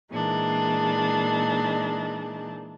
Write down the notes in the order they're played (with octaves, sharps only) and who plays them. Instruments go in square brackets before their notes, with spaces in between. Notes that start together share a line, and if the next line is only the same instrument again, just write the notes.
[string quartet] A#2 E3 G#3 D4 D#4